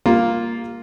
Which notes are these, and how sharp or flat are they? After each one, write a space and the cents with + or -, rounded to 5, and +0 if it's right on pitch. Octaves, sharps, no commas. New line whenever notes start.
G3 +35 A#3 +0 F4 +0